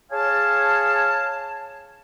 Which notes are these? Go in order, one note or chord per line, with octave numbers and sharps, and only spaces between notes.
G#4 C#5 F5 G#5 A5